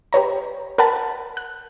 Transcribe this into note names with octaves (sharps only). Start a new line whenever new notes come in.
G4 B4 C#5 A#5
A#4 B4 F#5 A5 B5 A6
F#6